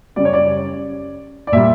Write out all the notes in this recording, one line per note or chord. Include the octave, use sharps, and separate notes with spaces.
F#2 C#3 G3 D5
C#5
D5
D5
A#2 G3 E5